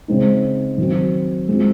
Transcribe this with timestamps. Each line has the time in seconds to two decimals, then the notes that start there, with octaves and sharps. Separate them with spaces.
0.08 C#3 G#3 C4 D#4
0.78 D#3 F#3 C4
1.48 G#3 C4 F4